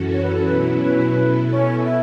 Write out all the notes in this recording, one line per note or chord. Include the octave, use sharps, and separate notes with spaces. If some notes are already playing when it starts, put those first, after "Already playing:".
Already playing: F#2 E3 C#4 F#4 A4
C#5
B4
A4
B2 F#3 C#4 E4 B4
B4
B2 B3 E4 A4
C#4
E4